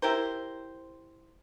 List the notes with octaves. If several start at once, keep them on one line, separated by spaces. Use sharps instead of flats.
E4 G4 A#4 C5